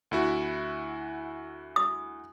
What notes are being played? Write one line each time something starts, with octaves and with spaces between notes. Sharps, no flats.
D2 E4 F#4
D#6